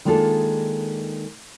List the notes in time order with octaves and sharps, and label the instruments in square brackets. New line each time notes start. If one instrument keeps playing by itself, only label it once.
[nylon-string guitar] D#3 G#3 A#3 D4 F4 A4